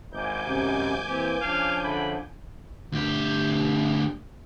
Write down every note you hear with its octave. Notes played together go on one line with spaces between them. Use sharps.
G#1 D#4 G#5 D6 G6
F#2 C3
E3 A#3 C4 G4
C#3 F3 D4 F5
D3 B5
D2 G4